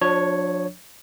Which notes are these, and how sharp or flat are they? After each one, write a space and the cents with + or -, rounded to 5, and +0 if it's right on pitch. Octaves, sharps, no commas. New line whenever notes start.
F3 +40 D4 +0 C#5 +0